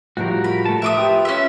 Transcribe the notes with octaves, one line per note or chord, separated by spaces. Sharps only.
A2 F3 G3 F#4 A#4
B5
A3 A5
F4 B4 E5 D6 D#6
G4
C#4 E5